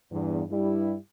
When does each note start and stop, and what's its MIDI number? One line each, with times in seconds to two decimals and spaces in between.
0.11 0.41 40
0.11 0.41 43
0.50 0.95 43
0.50 0.95 55
0.50 0.95 64